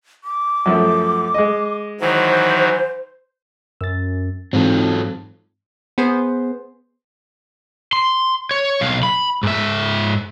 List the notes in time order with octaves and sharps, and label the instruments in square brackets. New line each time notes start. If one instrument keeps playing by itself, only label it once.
[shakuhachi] D6
[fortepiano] F#2 F3 A3
G#3 D#5
[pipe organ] D#3 E3 F#3 [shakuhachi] C5
[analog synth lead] F#2 [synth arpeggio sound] E6 A6
[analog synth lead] G#2 [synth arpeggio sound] E3 G#3 C4 [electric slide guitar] F#3 F4 A4
[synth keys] B3 G#4 C5
[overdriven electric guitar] C6
C#5
B1 F5
B5
G#2 E5